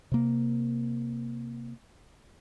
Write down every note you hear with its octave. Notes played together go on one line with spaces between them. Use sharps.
C3 A#3